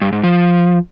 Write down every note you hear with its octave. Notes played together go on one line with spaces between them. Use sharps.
G2
G#2
F3